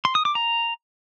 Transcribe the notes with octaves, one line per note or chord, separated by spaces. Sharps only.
C6
D#6
D6
A#5